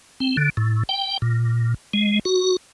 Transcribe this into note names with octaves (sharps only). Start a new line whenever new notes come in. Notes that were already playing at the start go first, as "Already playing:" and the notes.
C4
D3
A2
G5
A#2
G#3
F#4